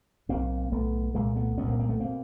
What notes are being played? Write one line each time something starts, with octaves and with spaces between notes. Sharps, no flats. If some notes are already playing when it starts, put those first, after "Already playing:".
B1 A2 A#3 C4
B1 A2 A3 B3
C2 A#2 G#3 A#3
A3 B3
C2 A#2 B3 C#4
A#3 C4
A#3 C4
A3 B3
B2 A#3 C4